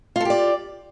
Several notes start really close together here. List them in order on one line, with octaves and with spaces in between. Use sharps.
F4 A4 G4 D5